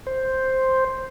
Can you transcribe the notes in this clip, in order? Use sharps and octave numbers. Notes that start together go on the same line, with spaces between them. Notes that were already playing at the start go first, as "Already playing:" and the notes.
C5